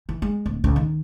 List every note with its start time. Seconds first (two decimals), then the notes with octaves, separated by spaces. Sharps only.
0.09 E3
0.22 G#3
0.46 D1
0.64 C#2
0.76 D#3